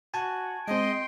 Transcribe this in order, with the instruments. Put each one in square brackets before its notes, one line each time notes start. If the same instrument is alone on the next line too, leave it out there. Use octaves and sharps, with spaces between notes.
[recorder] F#4 [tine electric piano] G#5 A5 G#6
[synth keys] G#3 C4 [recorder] D#5 [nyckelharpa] G5 C6